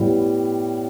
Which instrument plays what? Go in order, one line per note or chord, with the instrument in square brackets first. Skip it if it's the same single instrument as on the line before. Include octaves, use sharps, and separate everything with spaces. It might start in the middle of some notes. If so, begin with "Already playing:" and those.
Already playing: [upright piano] A2 G3 B3